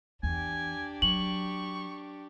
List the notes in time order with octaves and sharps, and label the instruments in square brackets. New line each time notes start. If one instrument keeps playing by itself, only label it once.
[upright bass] E2 [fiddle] D4 G4 [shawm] G#5
[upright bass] F#3 [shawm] C#6 [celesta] F#7